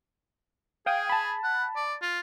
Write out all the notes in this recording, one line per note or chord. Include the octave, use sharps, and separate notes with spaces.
G#4 F5 G5 D#6
A5 B5
F#5
D5
F4